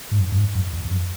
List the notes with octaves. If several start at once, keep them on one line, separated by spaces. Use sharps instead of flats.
G#2
F#2
F#2
G#2
F#2
E2
E2
F#2